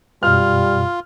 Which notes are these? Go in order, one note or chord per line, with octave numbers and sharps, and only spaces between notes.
F#2 B2 G3 F4 F6